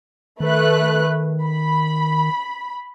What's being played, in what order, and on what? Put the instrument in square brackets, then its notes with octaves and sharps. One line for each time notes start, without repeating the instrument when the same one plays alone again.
[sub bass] D#3 [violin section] A3 B4 F#6
[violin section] B5